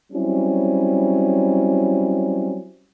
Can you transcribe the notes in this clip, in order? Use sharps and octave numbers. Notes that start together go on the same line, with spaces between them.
F#3 G3 C4 C#4 E4